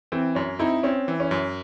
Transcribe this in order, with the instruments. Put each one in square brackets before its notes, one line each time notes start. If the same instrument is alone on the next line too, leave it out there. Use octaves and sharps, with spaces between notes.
[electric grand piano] E3 [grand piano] C4
[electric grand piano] F#2 [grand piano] C#4
[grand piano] C4 D#4 [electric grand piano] E4
[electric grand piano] C4 [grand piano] C#4
[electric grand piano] E3
[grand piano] C#4
[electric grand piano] F#2